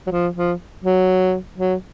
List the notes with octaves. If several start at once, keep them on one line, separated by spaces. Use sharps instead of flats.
F#3
F3
F3
F#3
F#3